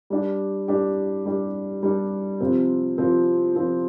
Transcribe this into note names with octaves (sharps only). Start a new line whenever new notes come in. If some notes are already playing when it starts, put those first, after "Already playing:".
G3 D4 G4
G3 D4 G4
G3 D4 G4
G3 D4 G4
C3 F3 C4
C3 F3 C4
C3 F3 C4